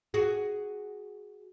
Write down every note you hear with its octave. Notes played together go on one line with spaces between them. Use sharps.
F#4 G#4